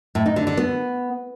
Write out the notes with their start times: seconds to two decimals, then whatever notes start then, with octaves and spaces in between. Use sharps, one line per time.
0.15 A2
0.26 D#4
0.36 D3
0.47 D3
0.57 B3